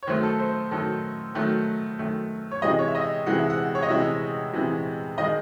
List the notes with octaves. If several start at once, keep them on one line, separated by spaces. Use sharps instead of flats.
C#5
D#3 F#3 A3 C5
A4
C5
D#3 F#3 A3 A4
D#3 F#3 A3
D#3 F#3 A3
C#5
C3 E3 G#3 D#5
C#5
E5
D#5
C3 E3 G#3 F#5
E5
F#5
C#5
D#5
C3 E3 G#3 E5
C3 E3 G#3
D#3 G#3 D#5